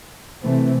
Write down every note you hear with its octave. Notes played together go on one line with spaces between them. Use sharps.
C3 E3 A3 C4